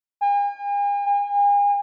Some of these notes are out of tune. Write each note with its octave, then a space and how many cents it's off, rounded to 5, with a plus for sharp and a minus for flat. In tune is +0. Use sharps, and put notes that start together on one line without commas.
G#5 -45
G#5 -40